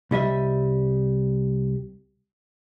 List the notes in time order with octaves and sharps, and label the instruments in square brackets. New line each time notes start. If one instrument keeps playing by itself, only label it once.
[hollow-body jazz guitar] C2 G3 D#5 E5